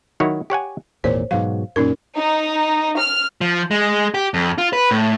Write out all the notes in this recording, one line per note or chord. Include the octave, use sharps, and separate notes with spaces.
D#3 F#3 E4 F#4 C#5
G4 C#5 F#5 G#5
G#1 E2 A#2 C5 C#5
G#2 B2 F#3 F5
F#2 A#2 C#4 D#4 A#4
D#4
F6
F3
G#3
G4
F2
F4
B4
A2